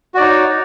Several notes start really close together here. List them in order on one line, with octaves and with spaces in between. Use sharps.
F#4 D5 D#4 C#5